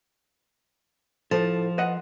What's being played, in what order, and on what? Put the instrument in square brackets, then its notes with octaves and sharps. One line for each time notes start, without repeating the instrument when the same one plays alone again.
[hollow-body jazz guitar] A2 A3 A4 [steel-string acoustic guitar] F3
[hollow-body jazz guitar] B4 D#5 F#5